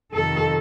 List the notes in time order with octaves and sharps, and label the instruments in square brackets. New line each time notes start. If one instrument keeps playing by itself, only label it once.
[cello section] F2 C3 D#3 A4